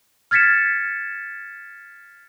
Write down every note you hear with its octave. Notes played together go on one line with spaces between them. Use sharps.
F6 G#6 A6 B6 C#7 E7